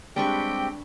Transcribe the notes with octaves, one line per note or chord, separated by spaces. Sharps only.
G3 G#3 C4 D4 G4 B4 G5 C#6